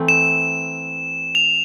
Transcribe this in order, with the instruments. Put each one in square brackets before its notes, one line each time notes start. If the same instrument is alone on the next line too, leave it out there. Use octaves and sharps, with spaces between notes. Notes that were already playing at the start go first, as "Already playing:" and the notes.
Already playing: [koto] E3 A3 C4
[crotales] E7
F7